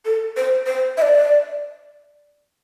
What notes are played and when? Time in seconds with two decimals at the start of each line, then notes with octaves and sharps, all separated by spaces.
0.06 A4
0.37 C5
0.67 C5
0.98 E5
1.02 D5